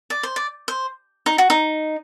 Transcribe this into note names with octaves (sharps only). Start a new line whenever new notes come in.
D5
C5
D5
C5
D#4
F#4
D#4